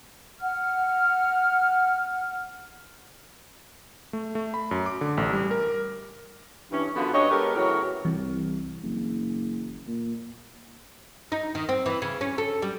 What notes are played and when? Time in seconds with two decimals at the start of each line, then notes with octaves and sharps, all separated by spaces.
0.41 F#5 F6
4.13 A3
4.35 A3
4.54 B5
4.71 F#2
4.86 D6
5.01 D3
5.17 A1
5.33 G3
5.51 A#4
6.71 G2 E3 C#4
6.95 F#2 D3 B3 F4 F#4
7.13 G2 C#5 D#5
7.30 G#3 B3 G4 A4 A#4
7.55 A2 C#3 E3 F#3 A#4 C#5
8.05 C2 E3
8.83 F#1
9.87 A#2
11.32 D#4
11.55 D#3
11.69 C4
11.86 E3
12.02 C#3
12.21 C#4
12.38 A4
12.62 G3